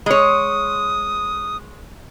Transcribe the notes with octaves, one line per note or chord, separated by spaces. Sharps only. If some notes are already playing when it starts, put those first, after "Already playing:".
G#3 C#5 D#6